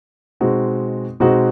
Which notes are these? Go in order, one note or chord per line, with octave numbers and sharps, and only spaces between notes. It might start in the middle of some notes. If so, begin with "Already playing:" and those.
B2 G#3 C4 D#4 F#4
B2 G#3 C4 D#4 F#4